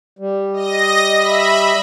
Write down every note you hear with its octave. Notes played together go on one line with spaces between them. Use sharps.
G3
D#5 A#6
E5 B5